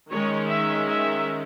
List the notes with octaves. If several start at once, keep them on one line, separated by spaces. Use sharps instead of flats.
D#3 G#3 C#4 C#5
E5
E5